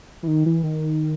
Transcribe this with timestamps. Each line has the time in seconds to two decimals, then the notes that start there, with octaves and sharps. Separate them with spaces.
0.23 E3
0.28 D#3
0.46 E3
0.63 D#3